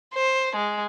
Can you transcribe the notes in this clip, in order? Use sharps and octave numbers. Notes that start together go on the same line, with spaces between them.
C5
G#3